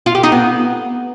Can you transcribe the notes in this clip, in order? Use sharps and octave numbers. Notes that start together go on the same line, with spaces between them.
F4
G4
D#4
B3